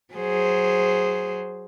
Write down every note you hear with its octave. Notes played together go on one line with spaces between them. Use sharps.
F#3 G#4 C5